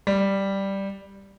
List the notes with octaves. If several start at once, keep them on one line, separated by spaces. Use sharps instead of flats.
G3